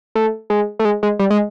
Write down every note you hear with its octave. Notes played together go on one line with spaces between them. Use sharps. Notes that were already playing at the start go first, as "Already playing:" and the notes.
A3
G#3
A3
G#3
G#3
G3
G#3